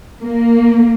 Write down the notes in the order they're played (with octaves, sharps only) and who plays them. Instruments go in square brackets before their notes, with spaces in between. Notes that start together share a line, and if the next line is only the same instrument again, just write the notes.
[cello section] A#3